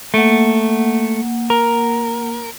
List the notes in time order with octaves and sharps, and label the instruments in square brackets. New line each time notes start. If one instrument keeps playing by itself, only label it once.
[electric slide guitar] A3 [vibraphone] A#3 F#5
[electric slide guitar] A#4